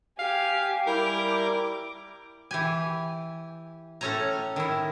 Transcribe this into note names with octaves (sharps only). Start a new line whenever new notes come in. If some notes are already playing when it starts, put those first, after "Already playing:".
G4 F5 G#5
G3 E4 A#4 D6 G6
E3 G4 G#5
A2 C#4 A4 C#5 G#5 A#5
D#3 E4